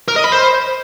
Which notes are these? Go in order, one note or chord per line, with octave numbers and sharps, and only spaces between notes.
A#4
D#5
B5
C5